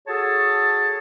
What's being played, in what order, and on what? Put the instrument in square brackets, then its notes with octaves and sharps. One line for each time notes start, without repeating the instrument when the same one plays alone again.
[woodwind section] F#4 G#4 A4 C#5 A5